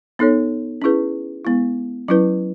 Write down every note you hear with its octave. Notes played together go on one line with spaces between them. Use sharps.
B3 D#4 A4 C#5
C#4 E4 G#4 B4
G#3 B3 E4
F#3 C#4 E4 B4